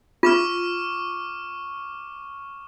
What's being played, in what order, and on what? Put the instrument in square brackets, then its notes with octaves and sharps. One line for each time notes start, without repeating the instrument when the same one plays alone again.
[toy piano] F4 [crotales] C#6 D6 F6